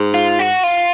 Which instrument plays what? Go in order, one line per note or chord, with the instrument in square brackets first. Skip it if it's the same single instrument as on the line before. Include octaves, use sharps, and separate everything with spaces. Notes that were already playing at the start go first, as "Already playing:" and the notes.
Already playing: [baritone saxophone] G#2
[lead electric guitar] F4
F#4
F4